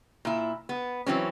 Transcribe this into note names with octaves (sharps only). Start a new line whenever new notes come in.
A#2 E4
B3
E3 F#3 C4 C#4